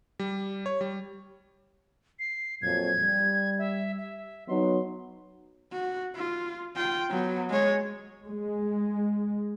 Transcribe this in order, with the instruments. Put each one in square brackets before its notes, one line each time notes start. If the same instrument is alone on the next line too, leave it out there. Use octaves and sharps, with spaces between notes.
[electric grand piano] G3
C#5
G3
[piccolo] C7
[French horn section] F2 A#2 F#3 [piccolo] G#6
[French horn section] G3
[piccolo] E5
E5
[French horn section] F#3 B3 D#4 [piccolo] C6
[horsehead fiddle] F#4
F4
F4 G5
F#3 B3
G#3 C#5
[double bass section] G#3